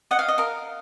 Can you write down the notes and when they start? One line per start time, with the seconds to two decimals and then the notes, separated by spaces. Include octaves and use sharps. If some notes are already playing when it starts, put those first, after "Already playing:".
0.11 D#5 F#5
0.19 F5
0.28 D#5
0.38 A#4 F5